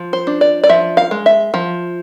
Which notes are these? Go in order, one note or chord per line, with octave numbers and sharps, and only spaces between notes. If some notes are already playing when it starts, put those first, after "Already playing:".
Already playing: F3
C5
D4
D5
D5
F3 E5
F5
G#3
E5
F3